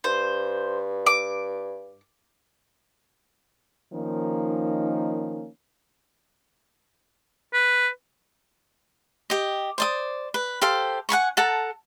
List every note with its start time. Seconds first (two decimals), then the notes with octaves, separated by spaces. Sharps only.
0.04 G2 C5
1.07 D6
3.93 D#3 F3 A#3 C#4 D#4
7.53 B4
9.30 G4 D#5
9.78 C5 D5 D#6
10.34 B4
10.62 G4 A4 C5 F5
11.09 F#5 G#5 B5 C#6
11.37 A4 F#5 A5 A#5